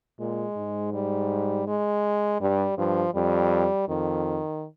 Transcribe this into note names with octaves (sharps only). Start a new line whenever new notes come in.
A#2 G#3
G#2
G3
G#3
G2 G3
G2 F3
F2 G3
F2 D#3